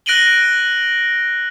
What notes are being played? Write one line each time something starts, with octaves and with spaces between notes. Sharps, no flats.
F#6 A#6 D7 D#7 F#7 G7